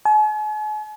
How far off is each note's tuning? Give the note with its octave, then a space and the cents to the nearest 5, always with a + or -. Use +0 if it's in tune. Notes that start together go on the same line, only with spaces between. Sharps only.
G#5 +45